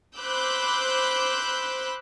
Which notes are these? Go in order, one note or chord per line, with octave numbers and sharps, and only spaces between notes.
C5 B5 D6 E6 F#6 G6